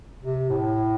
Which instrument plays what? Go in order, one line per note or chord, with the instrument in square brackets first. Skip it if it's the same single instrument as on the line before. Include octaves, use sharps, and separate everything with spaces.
[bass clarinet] C3
A2